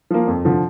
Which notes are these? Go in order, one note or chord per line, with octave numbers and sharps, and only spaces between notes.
F3 A#3
F2
D3 F3